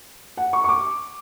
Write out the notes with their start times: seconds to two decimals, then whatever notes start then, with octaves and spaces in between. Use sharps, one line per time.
0.37 F#5
0.53 C#6
0.64 C#6
0.69 D6